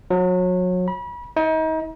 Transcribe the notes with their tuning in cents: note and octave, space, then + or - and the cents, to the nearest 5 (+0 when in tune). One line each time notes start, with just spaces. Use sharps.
F#3 -30
B5 -35
D#4 +35